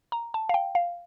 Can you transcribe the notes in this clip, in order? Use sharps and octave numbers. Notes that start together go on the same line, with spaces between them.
A#5
A5
F5
G5
F5